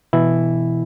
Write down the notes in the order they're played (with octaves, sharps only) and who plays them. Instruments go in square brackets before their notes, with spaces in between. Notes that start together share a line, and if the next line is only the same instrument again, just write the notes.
[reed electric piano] B2 E3 E4